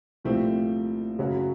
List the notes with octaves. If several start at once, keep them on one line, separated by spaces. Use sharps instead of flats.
C2 A#2 F3 A3 C4
F#2 C#3 F#3